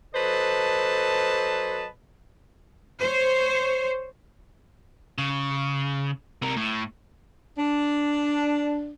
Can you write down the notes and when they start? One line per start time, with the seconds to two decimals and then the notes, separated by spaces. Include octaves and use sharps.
0.15 F#3 A4 B4 C5 D#5 A5
3.00 C5 C#5
5.18 C#3
6.42 C3 A#4
6.57 A2
7.58 D4